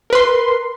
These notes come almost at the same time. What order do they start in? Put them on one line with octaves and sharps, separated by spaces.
A#4 B4 C6